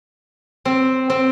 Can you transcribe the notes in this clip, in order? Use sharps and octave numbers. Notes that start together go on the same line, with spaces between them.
C4
C4